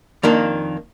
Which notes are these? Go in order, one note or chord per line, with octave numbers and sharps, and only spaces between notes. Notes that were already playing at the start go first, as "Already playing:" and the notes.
F2 D#3 A#3 D4